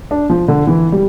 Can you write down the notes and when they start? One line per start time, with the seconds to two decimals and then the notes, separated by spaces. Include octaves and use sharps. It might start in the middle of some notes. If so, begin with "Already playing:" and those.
0.11 D4
0.30 F3
0.48 D3
0.67 E3
0.92 G3